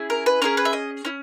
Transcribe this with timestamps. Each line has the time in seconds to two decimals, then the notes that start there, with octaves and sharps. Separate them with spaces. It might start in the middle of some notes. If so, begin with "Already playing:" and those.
Already playing: C#4 E4 G#4
0.10 A#4
0.26 B4
0.42 C#4 E4 G#4 A#4
0.57 B4
0.65 E5
0.73 D#5
1.05 C#4 E4